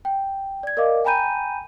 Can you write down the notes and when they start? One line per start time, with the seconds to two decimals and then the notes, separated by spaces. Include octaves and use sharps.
0.05 G5
0.63 D5 G#6
0.77 A#4 D5 D#5 F5 D6
1.04 G5 G#5 A#5 B5 G6 D#7